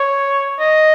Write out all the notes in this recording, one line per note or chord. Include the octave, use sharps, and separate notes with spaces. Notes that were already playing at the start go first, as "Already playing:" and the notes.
Already playing: C#5
D#5